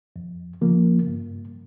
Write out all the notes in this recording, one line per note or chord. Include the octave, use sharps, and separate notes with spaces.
F2
C#3 F3 A#3
G2